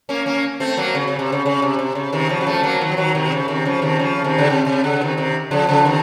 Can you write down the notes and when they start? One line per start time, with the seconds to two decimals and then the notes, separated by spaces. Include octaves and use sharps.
0.09 A#3 C#4
0.26 A#3 C#4
0.60 A3 C4
0.77 F#3 A#3
0.95 C#3
1.07 C#3
1.19 C3
1.32 C#3
1.46 C#3
1.62 C3
1.79 C3
1.95 C#3
2.13 C3 D#3
2.29 C#3 F3
2.41 F#3
2.47 F3 A3
2.63 F#3 A#3
2.81 D#3 F#3
2.92 F3
2.97 D#3 F#3
3.15 C3 D#3
3.26 C3
3.32 C#3
3.48 C3 D#3
3.65 C#3 F3
3.82 C3 D#3
3.99 C#3 F3
4.24 C3 D#3
4.38 C#3
4.50 C3
4.66 C3
4.84 C#3
5.01 C3 D#3
5.17 C3 D#3
5.51 C#3 F3
5.69 C#3 F3
5.85 C3 D#3